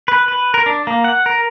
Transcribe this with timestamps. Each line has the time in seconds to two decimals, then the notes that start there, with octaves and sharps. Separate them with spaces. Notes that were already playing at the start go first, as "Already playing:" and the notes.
0.08 B4
0.28 B4
0.54 A#4
0.66 D4
0.87 A#3
1.04 F#5
1.26 A#4